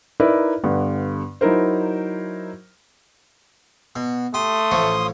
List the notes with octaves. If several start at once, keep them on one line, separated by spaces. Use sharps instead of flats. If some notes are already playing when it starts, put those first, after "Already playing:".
D#4 E4 A#4 B4 D5 E5
G2 D3 B3
F#3 D#4 E4 A#4 C5
B2
A3 G4 C6 D#6
A1 F3 C#5